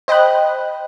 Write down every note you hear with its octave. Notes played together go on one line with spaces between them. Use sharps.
C5 D#5 G5 B5 F#6